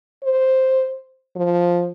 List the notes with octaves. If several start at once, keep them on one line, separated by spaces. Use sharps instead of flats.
C5
F3